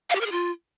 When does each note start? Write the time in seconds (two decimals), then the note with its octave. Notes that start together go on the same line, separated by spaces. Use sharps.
0.10 F5
0.15 G4
0.21 A#4
0.26 G#4
0.32 F4